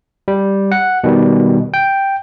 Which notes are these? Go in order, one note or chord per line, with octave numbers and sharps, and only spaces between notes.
G3
F#5
B2 D#3 G3
G5